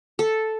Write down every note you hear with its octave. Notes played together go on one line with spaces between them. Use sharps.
A4